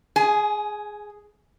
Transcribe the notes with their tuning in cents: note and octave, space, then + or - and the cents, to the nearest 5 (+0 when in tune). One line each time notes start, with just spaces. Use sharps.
G#4 +0 G#5 +30